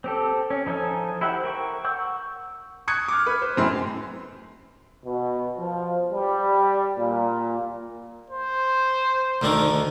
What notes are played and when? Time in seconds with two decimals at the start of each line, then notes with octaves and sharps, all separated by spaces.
0.04 C4 G4 A4
0.50 C#4
0.66 F3 D#4 A4 G#5
1.21 E4 G4 C5 F#5
1.44 A#4 G5 C#6
1.84 F#5 C#6 E6 G6
2.88 C#6 D#6 F#6 G#6 C#7
3.08 D6 F6
3.26 B4
3.42 C5
3.57 F#2 A2 C4 B5 C6
5.05 B2
5.59 F3
6.12 G3
6.98 A#2
8.30 C5
9.42 D2 D3 D#3